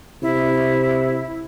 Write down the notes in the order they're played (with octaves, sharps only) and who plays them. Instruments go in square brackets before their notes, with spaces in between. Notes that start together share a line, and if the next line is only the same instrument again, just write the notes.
[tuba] C3 [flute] E4